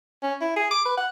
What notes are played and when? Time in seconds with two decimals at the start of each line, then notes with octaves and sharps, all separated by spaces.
0.23 C#4
0.41 E4
0.56 G#4
0.71 D6
0.85 B4
0.97 F#5